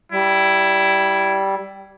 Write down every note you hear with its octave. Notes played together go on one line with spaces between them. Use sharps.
G3 E4